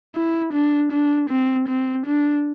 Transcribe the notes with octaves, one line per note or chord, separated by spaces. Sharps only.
E4
D4
D4
C4
C4
D4